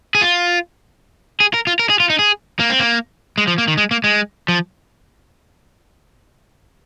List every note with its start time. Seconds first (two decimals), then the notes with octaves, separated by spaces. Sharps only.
0.15 G#4
0.21 F4
1.40 G#4
1.54 A#4
1.67 F4
1.79 A#4
1.90 G#4
2.00 F4
2.10 D#4
2.19 G#4
2.60 A#3
2.70 C4
2.79 A#3
3.38 G#3
3.47 F3
3.58 A#3
3.68 D#3
3.77 G#3
3.91 A#3
4.04 G#3
4.48 F3